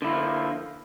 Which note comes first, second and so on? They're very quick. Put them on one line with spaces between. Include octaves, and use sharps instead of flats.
D3 E4 F4 A#3 F3